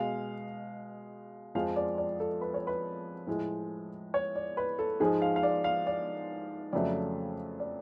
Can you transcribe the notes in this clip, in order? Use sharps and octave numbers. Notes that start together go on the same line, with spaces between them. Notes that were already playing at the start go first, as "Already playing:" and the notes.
Already playing: B2 G#3 F5
F2 F3 G#3 F5
D5
D5
A4
B4
C#5
B4
A2 F3 G#3
C#5
D5
B4
A4
G#2 F3 G#3 G#4
F5
F5
D5
F5
D5
F2 C#3 F#3 A3 D5
D5